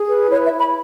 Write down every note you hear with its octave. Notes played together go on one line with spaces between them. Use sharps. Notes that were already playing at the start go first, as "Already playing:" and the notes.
Already playing: G#4
B4
E4 C#5
E5
E4
B5